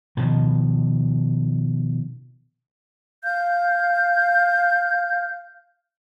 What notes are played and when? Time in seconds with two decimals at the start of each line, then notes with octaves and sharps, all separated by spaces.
0.17 B2 D#3 F3
3.24 F5 F6 G6